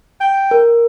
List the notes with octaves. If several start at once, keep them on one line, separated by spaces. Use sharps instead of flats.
G5
A#4